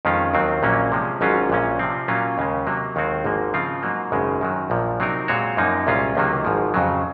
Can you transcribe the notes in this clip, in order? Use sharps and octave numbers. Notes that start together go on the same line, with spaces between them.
F2 D#3 G#3 C#4 F4
D#2 D#3 F#3 C4
A#1 A#2 F#3 A#3 C#4
C3 F3 G#3
G#1 G#2 F#3 C#4 F4
A#1 A#2 G#3 C#4
C3 F3 C4
A#2 F#3 A#3 C#4 F4
D#2 C#3 G#3
C3 F#3 A#3
D#2 D#3 G#3 C4 F#4
G#1 G#2 F3 A#3
C#3 F3 C4 F4
G#2 F#3 A#3
G#1 F#2 C#3 G#3
F#2 D#3 F#3
A#1 A#2 F3
C3 F#3 C4 D#4 A#4
A#2 G#3 C4 F#4 C#5
F#2 F3 A#3 D#4
C2 A#2 G#3 C#4 F4
C#2 C3 D#3 F#3 A#3
G#1 G#2 F3
F2 C#3 F#3